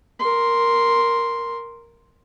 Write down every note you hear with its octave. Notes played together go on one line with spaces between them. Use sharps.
A#4 C6